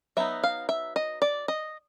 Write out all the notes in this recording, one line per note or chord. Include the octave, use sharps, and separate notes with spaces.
F#3 B3 D#4 E5
F5
E5
D#5
D5
D#5